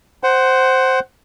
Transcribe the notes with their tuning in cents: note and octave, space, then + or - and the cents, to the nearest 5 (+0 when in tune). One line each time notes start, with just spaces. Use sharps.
C5 +0 F#5 +20